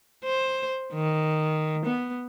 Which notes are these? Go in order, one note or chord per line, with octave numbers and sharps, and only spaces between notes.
C5
D#3
B3